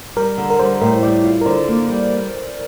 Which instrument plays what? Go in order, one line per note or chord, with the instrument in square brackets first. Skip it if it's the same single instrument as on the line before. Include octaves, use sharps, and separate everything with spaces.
[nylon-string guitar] G3 [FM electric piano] A#4
[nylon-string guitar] D3
[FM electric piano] A#4
[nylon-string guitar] G3 [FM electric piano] C5
[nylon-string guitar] A2 [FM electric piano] A#4
[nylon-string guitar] G3 [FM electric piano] D5
[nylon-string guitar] F4
[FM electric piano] A#4
[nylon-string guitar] D3 [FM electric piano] C5
[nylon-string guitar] A#3
G3